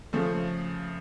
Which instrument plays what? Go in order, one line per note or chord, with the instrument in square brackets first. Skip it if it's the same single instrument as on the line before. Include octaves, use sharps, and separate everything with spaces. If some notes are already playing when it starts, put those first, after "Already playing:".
[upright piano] C#3 F3 A3